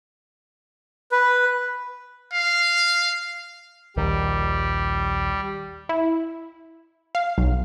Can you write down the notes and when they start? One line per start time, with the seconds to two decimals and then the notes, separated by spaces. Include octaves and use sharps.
1.12 B4
2.33 F5
3.97 A#1 D#2 D#3 G3
5.89 E4
7.15 F5
7.38 B1